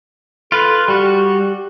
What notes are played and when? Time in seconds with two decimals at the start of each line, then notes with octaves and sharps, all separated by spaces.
0.52 F4 A4 B4
0.88 G3 F#4 G4